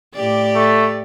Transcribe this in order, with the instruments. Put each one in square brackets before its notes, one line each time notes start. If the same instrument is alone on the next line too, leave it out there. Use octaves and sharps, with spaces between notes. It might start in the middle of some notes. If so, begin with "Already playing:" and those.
[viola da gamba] A2 G4 D5
[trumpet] A3